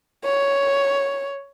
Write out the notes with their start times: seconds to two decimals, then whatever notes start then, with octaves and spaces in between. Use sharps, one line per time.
0.25 C#5